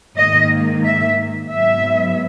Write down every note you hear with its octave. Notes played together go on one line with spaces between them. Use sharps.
G#2 D#3 A#3 D#5
E5
G#2 F#3 B3 E5